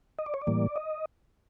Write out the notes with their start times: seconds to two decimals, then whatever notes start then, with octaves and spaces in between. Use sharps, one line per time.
0.19 D#5
0.26 D5
0.34 C#5
0.42 D5
0.47 A2 E3 G3 A#3
0.76 D#5